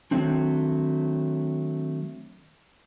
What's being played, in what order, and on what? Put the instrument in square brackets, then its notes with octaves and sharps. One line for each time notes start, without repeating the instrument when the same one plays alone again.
[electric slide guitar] D#3 F#3 A3 C4 D4